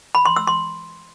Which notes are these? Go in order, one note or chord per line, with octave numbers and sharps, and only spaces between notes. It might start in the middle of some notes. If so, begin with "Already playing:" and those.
B5
C6
E6
C6